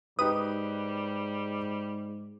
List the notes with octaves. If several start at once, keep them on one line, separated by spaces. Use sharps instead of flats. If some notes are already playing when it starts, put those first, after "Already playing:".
G#2 G3 D#4 G4 B4 D#6